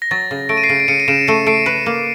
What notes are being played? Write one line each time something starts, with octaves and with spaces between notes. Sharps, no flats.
A#6
F#3 A6
C#3
A3 D7
D#7
C7 D7
C#3
D7
C#3 C#7 D#7
D#7
C#3 D7 E7
A3 C#7 D#7
A3 C7 D7
B4
A#3